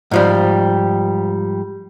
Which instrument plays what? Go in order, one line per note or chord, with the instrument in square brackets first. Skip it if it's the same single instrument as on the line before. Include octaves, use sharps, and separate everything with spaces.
[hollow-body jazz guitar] G#2 F3 G3